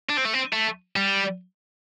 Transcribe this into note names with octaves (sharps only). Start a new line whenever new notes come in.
D4
C4
A3
C4
A3
G3